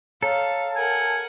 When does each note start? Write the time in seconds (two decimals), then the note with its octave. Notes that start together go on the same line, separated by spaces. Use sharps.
0.22 A4 C#5 F5 A#5
0.76 A#4 F#5 G#5